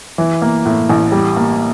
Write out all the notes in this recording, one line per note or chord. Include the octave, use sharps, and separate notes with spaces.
E3
A#3
A2
A1
G3
A#3